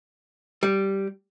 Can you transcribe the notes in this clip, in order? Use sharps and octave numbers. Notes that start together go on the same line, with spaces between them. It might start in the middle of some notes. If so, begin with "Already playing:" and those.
G3